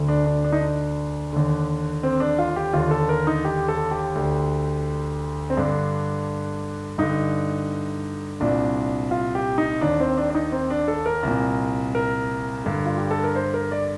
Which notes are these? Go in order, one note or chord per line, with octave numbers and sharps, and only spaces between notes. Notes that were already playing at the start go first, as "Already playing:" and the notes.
Already playing: D2 D3
D4
D4
D4
D#4
D4
D#2 D3
C4
D4
F4
G4
D#2 D3 F4
A4
A#4
D#4
G4
A4
G4
D2 D3
C4
G2 D3 D4
G2 D3 D#4
C2 A#2 D4
F4
G4
D#4
D#2 D#3 D4
C4
D4
D4
D#4
C4
D4
A4
A#4
C2 A#2
A#4
G2 D3
F4
G4
A4
A#4
C5
A#4
D5